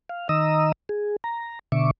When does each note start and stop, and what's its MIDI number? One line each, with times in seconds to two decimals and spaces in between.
0.09 0.28 77
0.29 0.72 51
0.29 0.72 75
0.29 0.72 82
0.29 0.72 87
0.29 0.72 88
0.89 1.16 68
1.24 1.59 82
1.72 1.91 47
1.72 1.91 50
1.72 1.91 76
1.72 1.91 85
1.72 1.91 86